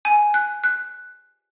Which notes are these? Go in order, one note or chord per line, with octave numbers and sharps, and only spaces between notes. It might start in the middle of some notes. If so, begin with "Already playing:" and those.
G#5
F#6
F#6